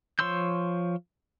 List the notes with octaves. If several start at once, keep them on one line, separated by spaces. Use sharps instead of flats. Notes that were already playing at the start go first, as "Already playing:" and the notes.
F3 C#5 C6 E6 G6